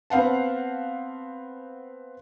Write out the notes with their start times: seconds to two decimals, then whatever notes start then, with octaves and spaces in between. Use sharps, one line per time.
0.10 B3 C4 F5 F#5 A5